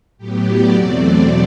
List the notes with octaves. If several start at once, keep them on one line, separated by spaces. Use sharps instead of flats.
A2 F#3 B3 G4
D5
E2 B2 F#3 A3 C4